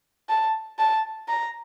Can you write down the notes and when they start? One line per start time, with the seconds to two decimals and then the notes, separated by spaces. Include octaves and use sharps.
0.29 A5
0.79 A5
1.29 A#5